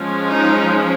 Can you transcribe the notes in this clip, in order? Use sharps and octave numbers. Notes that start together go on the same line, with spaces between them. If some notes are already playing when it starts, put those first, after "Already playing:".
Already playing: F3 G#3 C#4
D#4